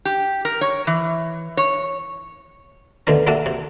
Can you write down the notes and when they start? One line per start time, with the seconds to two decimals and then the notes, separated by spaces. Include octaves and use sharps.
0.05 G4
0.45 A#4
0.61 C#5
0.87 E3
1.57 C#5
3.07 D2 B2 D3 A3 A#4
3.27 G3 A#3 F#4 A4 E5
3.46 C3